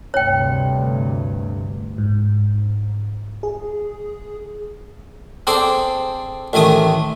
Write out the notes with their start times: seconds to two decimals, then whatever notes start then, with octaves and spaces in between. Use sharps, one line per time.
0.14 D2 G2 C3 C#5 G5
1.98 G#2
3.43 G#4
5.47 C4 G#4 A4 C5 D5
6.53 A1 D#3 A3 G#5 D#6